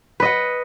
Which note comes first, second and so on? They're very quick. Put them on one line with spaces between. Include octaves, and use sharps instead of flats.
B4 D#5 F#5